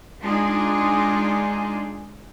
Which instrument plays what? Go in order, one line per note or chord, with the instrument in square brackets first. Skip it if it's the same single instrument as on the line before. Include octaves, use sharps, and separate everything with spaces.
[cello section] G#3 D4 D#4 F4 G#4